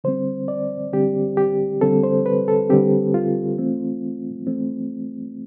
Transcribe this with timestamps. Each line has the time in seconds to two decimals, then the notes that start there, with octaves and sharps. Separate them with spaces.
0.04 D3 G3 C4 C5
0.48 D5
0.92 D3 G3 C4 G4
1.37 G4
1.81 D3 G3 C4 A4
2.04 C5
2.26 B4
2.48 A4
2.70 D3 G3 C4 G4
3.14 F4
3.58 E3 A3 C4
4.47 E3 A3 C4